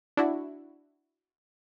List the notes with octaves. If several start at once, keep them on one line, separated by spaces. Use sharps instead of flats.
D4 E4 F#4